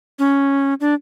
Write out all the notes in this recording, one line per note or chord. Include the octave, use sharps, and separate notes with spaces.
C#4
D4